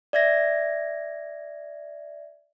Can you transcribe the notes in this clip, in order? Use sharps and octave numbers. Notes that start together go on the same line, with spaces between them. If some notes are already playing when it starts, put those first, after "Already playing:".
D5 E5 G#6 A#6